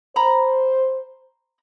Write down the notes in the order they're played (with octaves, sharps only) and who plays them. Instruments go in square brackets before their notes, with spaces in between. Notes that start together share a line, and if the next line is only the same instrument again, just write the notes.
[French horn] C5 [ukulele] A#5 B5